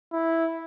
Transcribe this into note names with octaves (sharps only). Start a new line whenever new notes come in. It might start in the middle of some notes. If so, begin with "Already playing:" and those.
E4